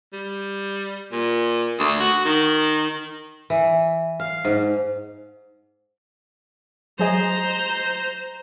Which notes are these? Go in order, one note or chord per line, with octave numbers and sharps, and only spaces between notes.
G3
A#2
D2
F#4
D#3
E3
F5
G#2
F#3 G#4 C5 D#5 A#5